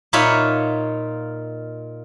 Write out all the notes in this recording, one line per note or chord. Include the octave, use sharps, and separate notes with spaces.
A#2 D#4 F4 C#5 E5 B5